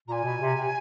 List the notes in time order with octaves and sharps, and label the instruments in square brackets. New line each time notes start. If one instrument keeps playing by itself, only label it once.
[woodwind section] A#2 [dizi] G#5 A#5
[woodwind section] B2
C3
C3